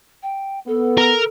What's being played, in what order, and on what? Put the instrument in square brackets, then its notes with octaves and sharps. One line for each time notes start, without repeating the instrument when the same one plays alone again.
[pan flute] G5
[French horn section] B3 [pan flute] A4
[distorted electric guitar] A#4